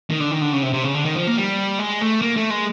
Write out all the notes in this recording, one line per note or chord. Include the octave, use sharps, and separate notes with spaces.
D#3
D3
D#3
D3
C#3
C3
C3
C#3
D3
D#3
F3
A#3
G3
G#3
A3
A#3
A3
G#3